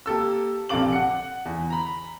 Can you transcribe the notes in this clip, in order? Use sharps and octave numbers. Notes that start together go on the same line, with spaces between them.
A#3 G4 A4 E6
A#1 C3 A4 F5 D6 F#7
F#5 C#7
E2
A#5 B5